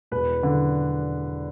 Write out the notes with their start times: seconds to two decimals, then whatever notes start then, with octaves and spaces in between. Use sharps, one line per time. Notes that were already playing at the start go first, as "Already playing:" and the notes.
0.11 E1 B4
0.43 D3